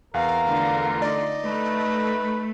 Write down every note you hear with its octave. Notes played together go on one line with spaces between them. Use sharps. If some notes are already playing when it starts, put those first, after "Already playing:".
E2 A#4 F5
D3 A3 F4
D#4 D5
A3 B4